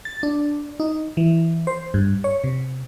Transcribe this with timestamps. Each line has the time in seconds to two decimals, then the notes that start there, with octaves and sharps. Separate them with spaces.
0.05 A6
0.23 D4
0.80 D#4
1.17 E3
1.67 C5
1.94 G2
2.24 C#5
2.44 C3